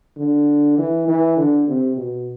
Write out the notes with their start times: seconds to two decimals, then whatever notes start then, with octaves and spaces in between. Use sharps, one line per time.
0.17 D3
0.78 E3
1.08 E3
1.37 D3
1.67 C3
1.97 B2